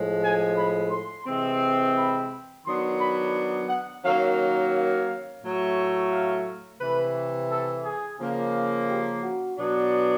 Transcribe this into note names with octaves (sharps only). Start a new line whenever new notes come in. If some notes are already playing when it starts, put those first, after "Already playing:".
Already playing: A2 F3 G#3
G#5
B5
C6
C3 E3 G#3 C4
B5
D#3 F#3 B3 D4 C6
B5
F#5
D#3 F#3 A#3 C#4 F5
F5
A2 F#3 A3
F5
C3 E3 A3 B4
A4
G#4
C#3 F3 A#3
G4
F#4
B2 F#3 B3 D4